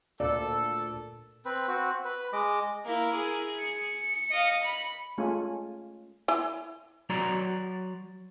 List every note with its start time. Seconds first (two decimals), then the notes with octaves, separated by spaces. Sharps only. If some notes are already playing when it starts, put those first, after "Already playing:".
0.20 D2 A#2 A4 D5
1.45 C4 B4
1.68 C4 F#4
2.05 B4
2.33 G#3 D#5 D6
2.85 A#3 E4 A#4
3.15 G#4
3.59 C#7
4.31 D#5 F5
4.63 B5
5.18 G#3 A3 C#4 F4 G#5
6.28 E4 G#5
7.09 F#3 F#4 D5 A#5 C6